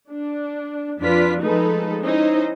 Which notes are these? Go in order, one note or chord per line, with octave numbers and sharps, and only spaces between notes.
D4
F2 D4 F4 B4 B6
F3 G#3 A3 D#4 A4 B4
C#4 D#4 E4 C5 D#5